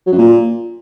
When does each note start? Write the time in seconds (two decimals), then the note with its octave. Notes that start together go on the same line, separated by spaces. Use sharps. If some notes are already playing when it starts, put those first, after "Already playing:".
0.07 F#3
0.12 F#2
0.18 A#2